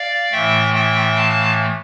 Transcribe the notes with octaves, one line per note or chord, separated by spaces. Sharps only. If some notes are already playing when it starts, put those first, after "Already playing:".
Already playing: D5 F5
A2 E3 A3 E5 G5
E5 G5
F5 A5